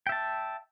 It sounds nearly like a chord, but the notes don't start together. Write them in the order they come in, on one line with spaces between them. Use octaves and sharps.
G5 E5 A5